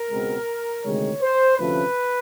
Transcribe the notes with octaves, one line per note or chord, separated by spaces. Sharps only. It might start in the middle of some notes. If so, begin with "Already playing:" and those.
Already playing: A#4
C#2 B2 G#3 C4
D2 C3 D#3 G#3 C#5
C5
D2 C3 F3 A3 C#4 B4